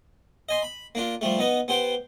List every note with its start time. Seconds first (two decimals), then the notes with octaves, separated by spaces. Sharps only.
0.49 D#5 G#5 C6
0.62 B5
0.95 A#3 D4 F4
1.21 F3 G3 A3
1.39 B3 D#4 D#5
1.68 B3 G4 C5 G5